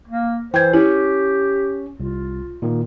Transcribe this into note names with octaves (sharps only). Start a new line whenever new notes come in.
A#3
E3 C5 G5 G#6
C#4 E4 G4
C2 F4
A#2 D#3